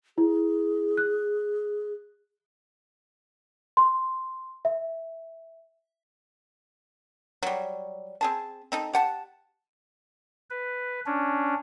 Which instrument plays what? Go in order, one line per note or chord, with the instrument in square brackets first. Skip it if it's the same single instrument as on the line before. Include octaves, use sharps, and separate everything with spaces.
[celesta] E4 [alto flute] G#4
[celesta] F#6
C6
E5
[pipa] F#3 G3
C4 G#4 A5
C4 D#4 A4
G4 F#5 A5
[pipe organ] B4
C#4 D4